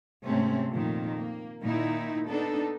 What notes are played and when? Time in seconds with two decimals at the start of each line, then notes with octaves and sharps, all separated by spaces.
0.24 G#2 C3 A3 C4 C#4
0.73 F2 A#2 D#3
1.18 A#3
1.61 A#2 D#3 D#4 E4
2.28 B3 D4 D#4 A4